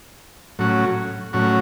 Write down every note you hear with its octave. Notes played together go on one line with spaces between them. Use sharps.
A2 F#3 C#4 F#4
A2 F#3 C#4 F#4